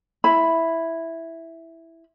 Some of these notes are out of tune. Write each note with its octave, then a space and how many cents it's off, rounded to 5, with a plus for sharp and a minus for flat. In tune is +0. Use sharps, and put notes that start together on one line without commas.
E4 +0 B5 +0